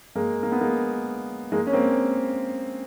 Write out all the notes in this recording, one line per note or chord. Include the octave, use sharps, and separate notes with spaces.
G#3 A#3
A#3
B3
G#3 A#3
G#3 A#3
C#4
A#3 C4